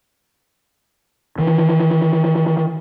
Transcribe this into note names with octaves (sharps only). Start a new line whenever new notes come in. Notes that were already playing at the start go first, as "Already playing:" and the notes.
D#3 E3